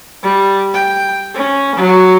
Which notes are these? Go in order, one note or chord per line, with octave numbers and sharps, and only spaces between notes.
G3
G5
C#4
F#3